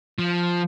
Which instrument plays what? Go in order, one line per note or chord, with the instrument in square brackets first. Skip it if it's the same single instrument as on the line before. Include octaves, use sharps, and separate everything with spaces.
[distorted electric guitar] F3